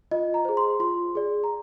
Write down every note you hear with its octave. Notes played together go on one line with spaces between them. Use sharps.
F4 D#5
A#5
G#4 C5
C6
F4 C6
G#4 D5
A#5